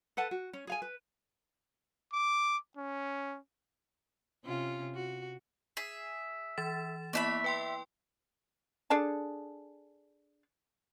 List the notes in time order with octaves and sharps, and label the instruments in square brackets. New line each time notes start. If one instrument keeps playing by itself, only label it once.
[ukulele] A4 B4 F#5 A5
F#4
C#4
G#4 F5 G#5
B4
[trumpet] D6
C#4
[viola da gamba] C3 C#4 F4
F#4
[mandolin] G#4 E5
[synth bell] E3 A6 E7
[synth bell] A#3 B3 E4 [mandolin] D5 E5 B5
[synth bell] B4 G5 C6
[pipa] D4 G#4 A4 A5